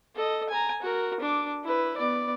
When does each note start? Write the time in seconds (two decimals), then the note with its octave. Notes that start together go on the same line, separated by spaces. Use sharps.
0.15 A4 D#5
0.49 G#5 A#5
0.82 F#4 A#4
1.20 D4 D6
1.64 E4 B4
1.97 B3 D5